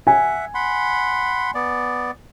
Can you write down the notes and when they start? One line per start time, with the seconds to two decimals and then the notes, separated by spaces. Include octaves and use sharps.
0.07 E5 F#5 G#5
0.54 F#5 B5 C6
1.55 B3 D5